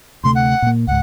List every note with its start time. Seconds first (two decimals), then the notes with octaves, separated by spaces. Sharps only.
0.24 D2 C3 A3 C6
0.35 F#5
0.62 A#2 A#3
0.87 C#2 G#2 F#5